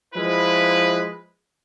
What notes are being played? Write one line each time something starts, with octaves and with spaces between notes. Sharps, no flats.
F3 G#3 E4 B4